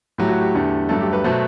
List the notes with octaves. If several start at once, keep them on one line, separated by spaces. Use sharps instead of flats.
A2 F#3 A3 G4
F#4
G4
E2 D3 A3
G2 F#3 A3 A4
G4
B4
B2 F#3 A3 C5